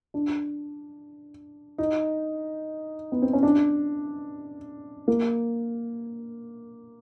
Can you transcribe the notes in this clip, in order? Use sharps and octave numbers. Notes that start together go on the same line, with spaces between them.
D4
D#4
B3
C4
C#4
D4
A#3